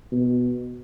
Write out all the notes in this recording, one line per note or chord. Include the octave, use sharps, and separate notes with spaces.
B2